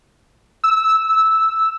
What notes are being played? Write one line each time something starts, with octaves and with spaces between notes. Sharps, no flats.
E6